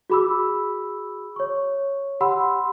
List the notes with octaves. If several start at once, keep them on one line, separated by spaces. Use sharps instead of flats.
F#4 G#4 B5 D6 E6
C#5 C#6
G4 F#5 B5 C6 E6